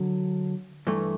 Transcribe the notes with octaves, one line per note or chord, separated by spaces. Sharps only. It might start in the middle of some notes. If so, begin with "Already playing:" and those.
Already playing: D3 F#3
G2 E3 A3